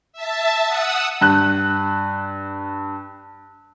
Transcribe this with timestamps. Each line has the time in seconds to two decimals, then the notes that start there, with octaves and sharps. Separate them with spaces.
0.13 E5 A5
0.66 F#5 D#6 E6
1.21 G2 F#6